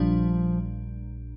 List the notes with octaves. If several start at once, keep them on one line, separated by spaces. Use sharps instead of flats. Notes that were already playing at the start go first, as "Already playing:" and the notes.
Already playing: A#1 A#2 F3 G3 D4